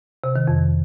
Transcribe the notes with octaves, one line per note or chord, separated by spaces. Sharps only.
C3
D#3
F2